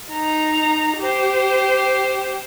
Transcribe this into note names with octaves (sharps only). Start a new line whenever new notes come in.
D#4 A#5
G4 C5